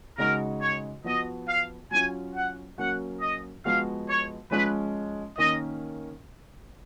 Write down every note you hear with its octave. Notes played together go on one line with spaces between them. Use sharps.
C#3 G#3 D#4 F#4 A#4
C#5
F3 B3 F#4 D#5
F5
F#3 C#4 F4 G#5
F#5
F#3 A#3 C#4 F#4 F#5
D#5
F3 G#3 B3 F#4 F5
C#5
F3 G#3 C#4 F4 B4
D#3 A#3 C#4 D#5